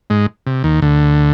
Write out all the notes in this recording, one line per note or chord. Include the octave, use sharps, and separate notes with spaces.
G#2 G#3
C3
D#2 D#3
D2 D3